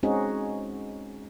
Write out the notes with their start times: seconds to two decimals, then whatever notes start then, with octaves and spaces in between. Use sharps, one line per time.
0.03 G#3 C4 C#4 D#4 F#4 G#4